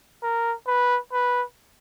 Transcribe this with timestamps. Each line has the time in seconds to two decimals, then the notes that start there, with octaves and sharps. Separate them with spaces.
0.23 A#4
0.67 B4
1.12 B4